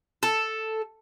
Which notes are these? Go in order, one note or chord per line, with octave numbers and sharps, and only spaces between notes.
A4